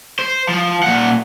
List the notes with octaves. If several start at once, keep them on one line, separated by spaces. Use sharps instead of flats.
C5
F3
A#2 F#5